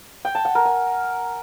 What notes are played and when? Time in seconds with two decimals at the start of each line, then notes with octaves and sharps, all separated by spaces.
0.25 G5
0.35 A5
0.45 F#5
0.55 A#4
0.65 G#5